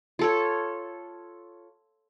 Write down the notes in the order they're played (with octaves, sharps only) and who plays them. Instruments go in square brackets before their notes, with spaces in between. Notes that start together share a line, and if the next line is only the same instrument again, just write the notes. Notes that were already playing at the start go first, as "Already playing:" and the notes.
[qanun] F4 A4 C#5